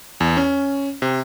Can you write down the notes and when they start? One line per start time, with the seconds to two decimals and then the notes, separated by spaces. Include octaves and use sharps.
0.20 E2
0.37 C#4
1.02 C3